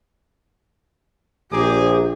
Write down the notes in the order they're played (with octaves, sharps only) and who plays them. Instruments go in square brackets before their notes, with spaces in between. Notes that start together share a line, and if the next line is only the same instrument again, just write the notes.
[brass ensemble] A#1 [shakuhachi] G4 [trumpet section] G#4 A#5 D6